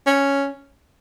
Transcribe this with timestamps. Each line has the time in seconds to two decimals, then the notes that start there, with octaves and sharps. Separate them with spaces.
0.06 C#4